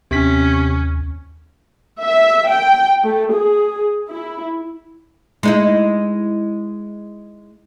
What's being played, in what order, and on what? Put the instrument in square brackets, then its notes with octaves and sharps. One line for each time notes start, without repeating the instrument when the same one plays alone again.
[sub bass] D#2 [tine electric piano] C3 B6 [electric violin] C#4
[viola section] E5
G5
A3
G#4
E4
[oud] G#3 D#4 E4